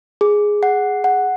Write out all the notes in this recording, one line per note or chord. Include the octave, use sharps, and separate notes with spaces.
G#4
F#5
F#5